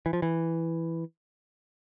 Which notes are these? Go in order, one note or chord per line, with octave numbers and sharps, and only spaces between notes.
E3
F3
E3